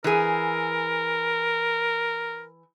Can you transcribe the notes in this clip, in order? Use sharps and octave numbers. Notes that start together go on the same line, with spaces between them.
E3 G#4 A#4